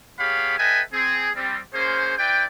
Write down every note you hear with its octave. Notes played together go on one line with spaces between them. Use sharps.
B3 G4 G#4 C#5 F5 B5
A4 B4 D#5 E5 G5 G#5
C4 G#4
G3 C4
A#3 C#4 G#4 C5
E4 B4 D5 G5